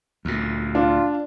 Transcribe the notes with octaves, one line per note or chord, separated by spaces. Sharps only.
D2 A#2
D4 F4